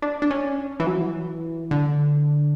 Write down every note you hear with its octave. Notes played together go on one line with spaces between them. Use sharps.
D4
D4
C#4
E3
F#3
E3
D3